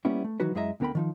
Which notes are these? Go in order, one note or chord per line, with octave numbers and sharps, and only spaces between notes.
G3 A#3 B3 C#4 E4
A3
D#3 E3 F#3 D#4 F#4 B4
F#2 G#3 E4 D#5 E5 A#5
D2 D3 B3 A#4 G5 B5
D#3 F3 D#4